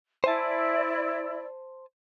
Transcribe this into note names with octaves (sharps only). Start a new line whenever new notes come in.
E4 C5 D5 G#5 A5